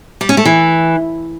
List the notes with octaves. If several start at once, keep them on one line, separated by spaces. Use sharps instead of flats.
G3
C#4
A3
E3